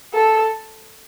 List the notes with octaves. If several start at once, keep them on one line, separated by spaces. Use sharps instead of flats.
A4